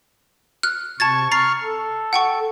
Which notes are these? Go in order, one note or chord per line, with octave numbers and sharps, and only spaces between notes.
F6 F#6
C3 A5 C#6 G#6 A6
A#5 C#6 F6 A6 C7
A4
F#5 G5 C#6